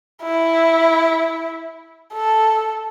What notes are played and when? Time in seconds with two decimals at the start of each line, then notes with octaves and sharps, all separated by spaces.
0.23 E4
2.14 A4